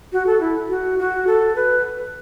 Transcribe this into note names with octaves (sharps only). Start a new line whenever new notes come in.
F#4
A4
E4
F#4
F#4
A4
B4